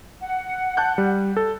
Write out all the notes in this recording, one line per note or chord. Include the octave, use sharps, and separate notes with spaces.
F#5
A5 F#6 G6
G3
A4